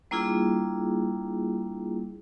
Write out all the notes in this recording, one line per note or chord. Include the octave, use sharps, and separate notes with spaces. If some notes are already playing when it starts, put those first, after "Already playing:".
G3 A#3 D4 E4 F4 G#4